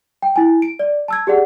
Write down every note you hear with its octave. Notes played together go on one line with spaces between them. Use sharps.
G5
E4 G#5
D7
D5
A5 E6 G#6
G4 G#4 D5 F#5